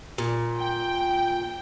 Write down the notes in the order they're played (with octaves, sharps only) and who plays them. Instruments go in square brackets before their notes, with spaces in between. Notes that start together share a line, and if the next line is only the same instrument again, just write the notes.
[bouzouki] A#2
[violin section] G5